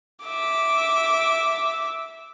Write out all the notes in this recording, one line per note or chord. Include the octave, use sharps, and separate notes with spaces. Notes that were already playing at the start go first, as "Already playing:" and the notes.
E5 D6